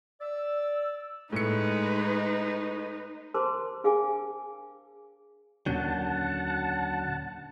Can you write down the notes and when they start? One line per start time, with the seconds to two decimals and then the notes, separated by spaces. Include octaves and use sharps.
0.21 D5 E6
1.32 A2 G#3 D#4 B4 C#7
3.34 A#4 C5 A5 A#5 C6 D6
3.84 D4 G#4 F5 G5 G#5 D6
5.66 D#2 A#2 D3 F#3 C#4 F#5 A5 G6